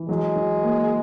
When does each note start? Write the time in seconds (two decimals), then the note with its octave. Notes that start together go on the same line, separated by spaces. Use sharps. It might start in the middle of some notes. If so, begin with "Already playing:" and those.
Already playing: E3
0.08 F#3 G#3
0.36 F#3
0.63 A#3